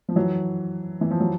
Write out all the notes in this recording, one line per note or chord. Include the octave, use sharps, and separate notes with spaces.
F3
E3 F#3
E3
F3
F#3